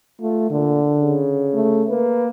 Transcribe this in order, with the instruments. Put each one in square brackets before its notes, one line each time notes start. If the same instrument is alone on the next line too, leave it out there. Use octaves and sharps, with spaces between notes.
[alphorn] A3 [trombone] F4
[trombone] A#2 [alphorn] D3
[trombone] C#3
[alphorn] A3
[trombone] A#3 [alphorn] B4